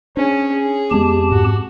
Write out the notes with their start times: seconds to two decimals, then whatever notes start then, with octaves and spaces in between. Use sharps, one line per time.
0.17 C#4 D4 G#4
0.53 G#4
0.91 F2 G#3 B3 C4 G4 A5
1.32 G#2 F#4